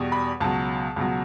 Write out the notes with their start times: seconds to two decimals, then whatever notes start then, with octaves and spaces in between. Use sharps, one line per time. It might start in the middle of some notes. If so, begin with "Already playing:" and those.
Already playing: E2 B2 G3
0.12 B5
0.40 C#2 B2 F#3 A5
0.96 C#2 B2 F#3